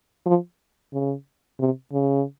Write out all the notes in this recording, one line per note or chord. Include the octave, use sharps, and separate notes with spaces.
F3
C#3
C3
C#3